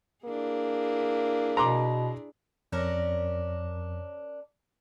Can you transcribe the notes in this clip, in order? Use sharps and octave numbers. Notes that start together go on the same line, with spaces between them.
A#3 D4 E4 G#4
B2 A#5 C6 D6
F2 C#4 D4 A#4